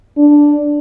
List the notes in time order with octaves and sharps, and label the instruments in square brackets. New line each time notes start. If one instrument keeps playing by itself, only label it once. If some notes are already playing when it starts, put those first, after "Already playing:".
[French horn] D4